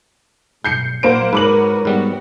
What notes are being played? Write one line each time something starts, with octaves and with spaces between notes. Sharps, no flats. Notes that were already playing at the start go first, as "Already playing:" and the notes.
B1 G2 G6 C7 C#7
A#1 F#3 A#3 C5 F#5 D7
G#2 F#4 A#4 B4 C#5 D6 F#7
G#2 G3 B3 F#4